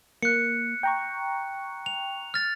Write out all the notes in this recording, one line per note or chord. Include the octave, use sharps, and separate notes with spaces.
A#3 F#6 C#7
G5 A#5 C#6
F7
F6 A6